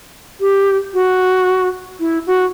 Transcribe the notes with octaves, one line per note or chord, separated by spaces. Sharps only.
G4
F#4
E4
F#4